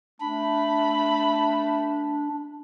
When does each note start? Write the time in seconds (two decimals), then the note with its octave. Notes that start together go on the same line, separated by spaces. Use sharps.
0.21 A3 D4 B5